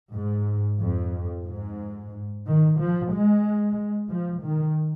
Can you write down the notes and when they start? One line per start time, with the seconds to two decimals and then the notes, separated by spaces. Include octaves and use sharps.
0.14 G#2
0.79 F2
1.45 G#2
2.44 D#3
2.78 F3
3.10 G#3
4.10 F3
4.42 D#3